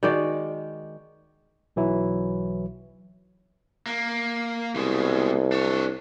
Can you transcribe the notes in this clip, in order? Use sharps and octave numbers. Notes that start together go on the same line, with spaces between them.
D#3 G#3 F#4 D5
B1 E3 F#3 E4
A#3
C2 B2 G#3
D4 C#5